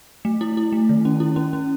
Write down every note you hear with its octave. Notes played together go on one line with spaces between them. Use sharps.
A3
E4
E4
A3
D#3
C#4
E4
C#4
C#4